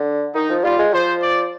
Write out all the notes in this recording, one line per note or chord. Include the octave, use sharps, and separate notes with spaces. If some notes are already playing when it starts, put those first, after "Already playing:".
Already playing: D3
D#3 D#4
F3
G3 F4
G#3
F3 C5
D5